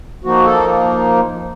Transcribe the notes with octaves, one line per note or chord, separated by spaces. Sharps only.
F3 A#3 D#4 F#4
A4